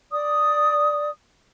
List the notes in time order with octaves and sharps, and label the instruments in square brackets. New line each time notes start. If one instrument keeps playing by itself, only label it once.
[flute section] D5 D#6